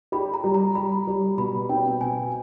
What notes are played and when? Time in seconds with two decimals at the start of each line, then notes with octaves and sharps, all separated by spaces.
0.12 G4 B5
0.34 A#5
0.44 G3
0.54 A#5
0.75 G3 B5
1.07 G3
1.38 B2 B5
1.69 C4 G5
2.01 B2 G#5